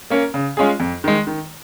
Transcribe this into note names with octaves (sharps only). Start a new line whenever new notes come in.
A#3 C#4 A#4
C#3
G#3 C#4 F4 G#4
F2
D#3 G#3
D#3